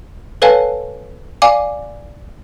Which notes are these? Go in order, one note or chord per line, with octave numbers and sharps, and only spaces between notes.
A4 B4 C#5 F5 G#5 A5
D5 F5 G#5 D6